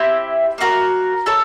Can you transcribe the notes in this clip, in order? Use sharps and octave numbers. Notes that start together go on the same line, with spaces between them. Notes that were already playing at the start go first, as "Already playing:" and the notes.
Already playing: C4 E4 G4
A#3 D#4 F#4 A#4
E4 A4 C#5